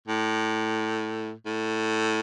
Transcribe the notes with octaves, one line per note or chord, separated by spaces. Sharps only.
A2
A2